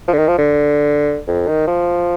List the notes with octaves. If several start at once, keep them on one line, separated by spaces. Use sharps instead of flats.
F3
D3
D#3
F3
D3
F2
D#3
F3